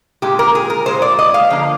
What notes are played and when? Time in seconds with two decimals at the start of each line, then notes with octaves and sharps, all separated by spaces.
0.22 A#2 G#3 G4
0.39 A#4
0.55 G#4
0.70 A#4
0.86 A#2 G#3 C5
1.02 D5
1.19 D#5
1.34 F5
1.50 D3 F3 A#3